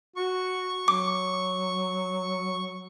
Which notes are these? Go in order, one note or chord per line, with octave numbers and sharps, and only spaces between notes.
F#4 C#6
F#3 D6